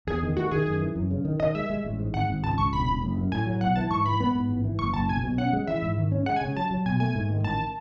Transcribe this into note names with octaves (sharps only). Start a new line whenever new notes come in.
E2 G#4
D#3
A3 F#4
D#3 G#4
F#2
E3
F#2
C#3
D#3
D#3 D#5
G#3 E5
G#3
A1
G#2
G#1 F#5
G#1
C#2 A5
C#2 C#6
E1 B5
E1
F#1
F#2
A2 G#5
F#3
B1 F#5
E3 A5
G#2 C#6
E3 B5
B3
G#2
A1
E3
F#1 C#6
F#1 A5
B1 G#5
B2
C#4 F#5
G#3
E3 E5
G#2
D#3
C#4
G#3 F#5
G#5
C#3
F#3 A5
F#3
B2 G#5
A3 G#5
G#2
D#3
A1 A5